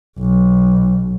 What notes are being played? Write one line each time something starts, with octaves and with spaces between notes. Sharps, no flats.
B1